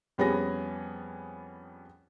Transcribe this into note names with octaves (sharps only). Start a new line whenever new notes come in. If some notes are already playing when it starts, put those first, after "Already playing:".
F2 G3 B3 C#4 G#4 A#6